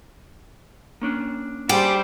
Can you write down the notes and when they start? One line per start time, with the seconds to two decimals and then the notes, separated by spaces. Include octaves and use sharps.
1.02 A#3 C#4 D4
1.69 G3 G4 G#4 C5